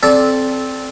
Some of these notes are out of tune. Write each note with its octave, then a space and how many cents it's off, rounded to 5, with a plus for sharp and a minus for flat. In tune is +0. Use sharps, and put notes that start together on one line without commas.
C4 +0 A4 -20 D5 -5